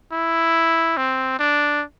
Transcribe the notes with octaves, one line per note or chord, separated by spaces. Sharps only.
E4
C4
D4